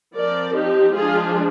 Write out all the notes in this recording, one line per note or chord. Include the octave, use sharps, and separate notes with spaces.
F3 C4 A#4 D5
D#4 G4
F3 G#3 D4 F4 G#4